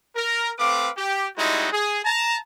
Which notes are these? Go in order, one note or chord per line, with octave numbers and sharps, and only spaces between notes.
A#4
A3 C4 B4 F5 D6
G4
G3 G#3 C4 D#4 E4 F#4
G#4
A5 A#5